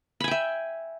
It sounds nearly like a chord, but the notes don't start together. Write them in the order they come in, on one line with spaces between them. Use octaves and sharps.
B5 G#5 G5 E5